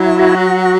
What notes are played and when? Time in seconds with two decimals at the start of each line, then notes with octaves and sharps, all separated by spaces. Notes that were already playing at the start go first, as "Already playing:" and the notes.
Already playing: F#3 E4
0.19 F#4